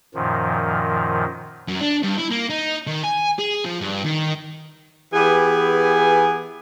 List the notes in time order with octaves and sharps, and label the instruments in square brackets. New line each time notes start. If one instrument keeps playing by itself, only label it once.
[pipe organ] F#2 A#2 D#3 F3
[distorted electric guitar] F#2
D4
G2
E4
A#3
D#4
D#3
G#5
G#4
F3
G2
D#3
[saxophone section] E3 B3 G4 G#4